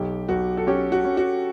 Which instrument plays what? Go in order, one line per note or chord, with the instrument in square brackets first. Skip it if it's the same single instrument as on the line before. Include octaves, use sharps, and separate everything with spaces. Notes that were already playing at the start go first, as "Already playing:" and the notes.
Already playing: [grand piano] B1 [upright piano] G4
[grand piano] B1 [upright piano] F#4
[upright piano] A4
[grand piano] C#4 [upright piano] G4
[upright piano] F#4
[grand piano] C#4
[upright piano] F#4